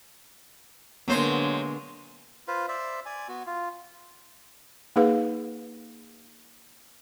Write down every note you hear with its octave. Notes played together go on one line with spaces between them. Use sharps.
D3 F#3 G#3 A#3 B3 C5
F4 B4 C5 F5
C5 D5 E5
D5 G#5
B3 F#4
F4
A#3 D#4 G#4 B4 F5